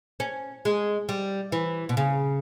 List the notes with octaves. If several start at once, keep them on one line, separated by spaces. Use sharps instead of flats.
C#4
G#3
G3
E3
B2
C#3